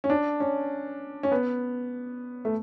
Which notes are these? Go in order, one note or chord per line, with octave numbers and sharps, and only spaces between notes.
C#4
D4
C#4
C#4
B3
A3